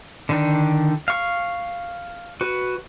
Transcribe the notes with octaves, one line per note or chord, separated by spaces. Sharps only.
D3 D#3 D4
F5 C#6
F#4 B4